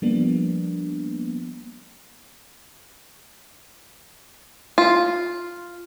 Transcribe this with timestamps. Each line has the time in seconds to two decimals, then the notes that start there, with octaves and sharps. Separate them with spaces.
0.02 F3 G3 A#3 B3 D4
4.78 F4